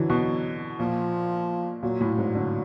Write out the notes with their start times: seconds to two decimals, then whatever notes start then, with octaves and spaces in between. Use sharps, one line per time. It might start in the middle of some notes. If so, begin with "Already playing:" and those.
Already playing: D3 E3 F#3
0.10 B2
0.79 A#2 F3
1.83 A#2 F#3
2.01 A2
2.18 G#2
2.35 D3